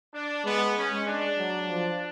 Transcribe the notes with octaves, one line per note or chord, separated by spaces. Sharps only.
D4
G#3 B3
C#4
G#3
D4
F#3
F3